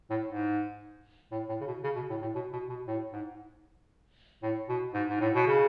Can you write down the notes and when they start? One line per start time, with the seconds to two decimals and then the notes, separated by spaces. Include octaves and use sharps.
0.10 A2
0.28 G#2
1.32 A2
1.49 A2
1.61 C#3
1.67 B2
1.84 C#3
1.96 B2
2.10 A2
2.22 A2
2.35 B2
2.52 B2
2.69 B2
2.87 A2
3.13 G#2
4.42 A2
4.69 B2
4.94 G#2
5.09 G#2
5.20 A2
5.34 B2
5.46 C#3